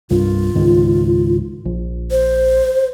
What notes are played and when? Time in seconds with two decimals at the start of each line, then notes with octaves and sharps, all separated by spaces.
0.10 C2 G2 F4
0.55 C#2 G#2 D#3
1.65 A#1
2.11 C5